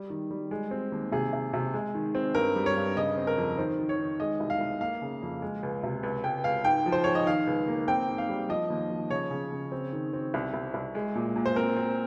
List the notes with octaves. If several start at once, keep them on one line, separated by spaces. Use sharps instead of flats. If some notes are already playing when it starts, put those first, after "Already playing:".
Already playing: G3
D#3
G3
G#3
C4
D#2
C3 G#4
C3
C3
G#3
D#3
C4
G2 A#4
G3
C#5
G2
C#3 D#5
C4
A#4
F2
D#3 C5
D#3
C#5
D#3
G#3 D#5
C2
F5
C2
A#3 F5
C#3
F2
G#3
C#2
C3
C#2
C#2 G5
C#2 F5
G#2 G5
F3
C5
G#2 C#5
D#5
D#3 F5
C#2
A#3
C4 G5
G#2
F5
G3
F3 D#5
D#2
F3
C#3 C#5
C#3
C#3
C4
D#3
C4
C2
C2
C2
G#3
A#2
A#2
C5
C4 A#4
C4